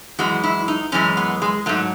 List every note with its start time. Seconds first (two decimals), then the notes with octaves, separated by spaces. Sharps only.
0.19 F#2 E3 G#3 F#4
0.44 E4
0.68 D#4
0.92 F#2 E3 G#3 C#4
1.17 B3
1.42 G#3
1.66 G#2 F#3 A3